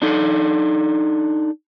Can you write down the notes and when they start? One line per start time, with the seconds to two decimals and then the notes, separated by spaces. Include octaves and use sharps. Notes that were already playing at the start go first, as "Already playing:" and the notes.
0.02 D4 D#4 A4